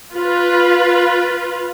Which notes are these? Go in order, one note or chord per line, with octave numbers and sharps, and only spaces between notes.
F4 B4